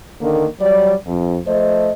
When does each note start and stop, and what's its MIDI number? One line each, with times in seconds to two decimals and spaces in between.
0.21 0.47 50
0.21 0.47 51
0.21 0.47 58
0.60 0.95 54
0.60 0.95 55
0.60 0.95 74
1.07 1.38 41
1.46 1.91 53
1.46 1.91 57
1.46 1.91 72
1.46 1.91 75